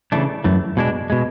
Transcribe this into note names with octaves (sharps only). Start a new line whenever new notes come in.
C#3 E3 A3 D4
F#2 E3 A3
B2 G#3 D4
B2 G#3